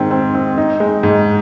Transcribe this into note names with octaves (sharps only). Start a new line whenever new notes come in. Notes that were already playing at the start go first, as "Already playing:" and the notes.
Already playing: G#2 D#3 C4
C4
C4
D#4
G#3
G#2